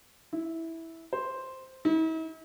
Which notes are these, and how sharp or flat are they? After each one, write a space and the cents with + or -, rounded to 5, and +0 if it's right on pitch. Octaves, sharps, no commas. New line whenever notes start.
E4 -10
C5 +0
E4 -45